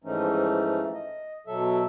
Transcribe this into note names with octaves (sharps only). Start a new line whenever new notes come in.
G#2 E3 F3 A3 C#4 D#4
D#5
B2 F#3 A4 E5